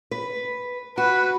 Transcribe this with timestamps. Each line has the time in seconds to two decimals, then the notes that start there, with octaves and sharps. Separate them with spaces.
0.11 B4
0.98 F#4 B4